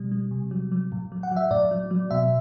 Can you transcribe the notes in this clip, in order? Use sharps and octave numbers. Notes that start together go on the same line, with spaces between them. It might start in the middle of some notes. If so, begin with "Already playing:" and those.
Already playing: B2 G3
G3
C3
F#3
F#3
A2
F#3
F#5
F#3
E5
A2 D5
F#3
F#3
B2 E5